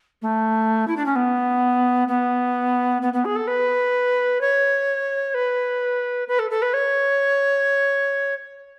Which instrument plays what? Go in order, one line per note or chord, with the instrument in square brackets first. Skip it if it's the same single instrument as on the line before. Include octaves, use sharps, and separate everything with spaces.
[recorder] A3
E4
D4
C#4
B3
B3
B3
B3
G#4
A4
B4
C#5
B4
B4
A4
A4
B4
C#5